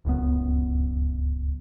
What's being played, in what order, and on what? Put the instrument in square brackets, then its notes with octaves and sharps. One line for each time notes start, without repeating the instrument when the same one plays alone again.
[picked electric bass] D1 C#2 F#2 B3